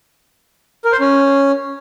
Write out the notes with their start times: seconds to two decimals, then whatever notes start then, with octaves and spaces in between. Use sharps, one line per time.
0.85 A#4
0.92 C5
1.00 C#4